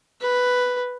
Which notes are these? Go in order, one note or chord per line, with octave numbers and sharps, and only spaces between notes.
B4